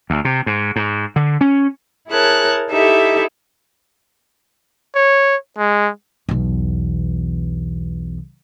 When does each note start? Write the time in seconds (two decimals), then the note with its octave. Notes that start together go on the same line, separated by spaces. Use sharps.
0.10 D2
0.25 C3
0.46 G#2
0.76 G#2
1.16 D3
1.41 C#4
2.08 E4 G#4 A#4 C#5 A5 F#6
2.70 D#4 E4 G4 A4 E5
4.95 C#5
5.58 G#3
6.29 B1 E2